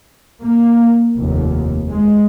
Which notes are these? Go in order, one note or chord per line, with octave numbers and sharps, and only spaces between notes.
A#3
F1 D#2
G#3